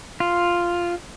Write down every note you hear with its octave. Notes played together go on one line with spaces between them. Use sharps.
F4